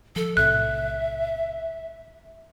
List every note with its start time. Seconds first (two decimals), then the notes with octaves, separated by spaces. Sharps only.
0.16 F3 A4
0.37 B1 A2 C3 E5 F#6